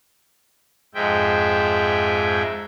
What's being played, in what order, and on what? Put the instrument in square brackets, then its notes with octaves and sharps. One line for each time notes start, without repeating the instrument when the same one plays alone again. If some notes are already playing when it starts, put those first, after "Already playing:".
[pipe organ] F2 G#2 G#3 E5 G5